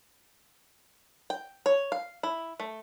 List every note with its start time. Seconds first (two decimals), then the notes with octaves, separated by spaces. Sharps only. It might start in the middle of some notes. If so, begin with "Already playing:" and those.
1.30 G5
1.66 C#5
1.92 F5
2.23 E4
2.60 A3